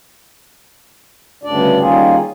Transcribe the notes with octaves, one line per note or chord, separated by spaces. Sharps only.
D2 G2 C#3 D4 D5
D#3 G3 A#3 C#4 F4 G#4